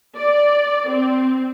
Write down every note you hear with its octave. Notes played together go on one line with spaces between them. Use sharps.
D5
C4